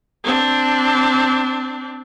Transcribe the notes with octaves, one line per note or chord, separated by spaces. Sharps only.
C4 D4